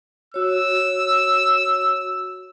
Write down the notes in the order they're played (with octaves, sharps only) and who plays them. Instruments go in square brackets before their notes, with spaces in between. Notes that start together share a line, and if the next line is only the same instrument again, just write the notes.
[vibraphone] F#4 C#5 [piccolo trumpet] E6